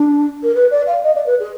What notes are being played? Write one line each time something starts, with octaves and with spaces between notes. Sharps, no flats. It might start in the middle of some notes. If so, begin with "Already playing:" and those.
Already playing: D4
A#4
B4
D5
F5
D#5
D5
B4
G#4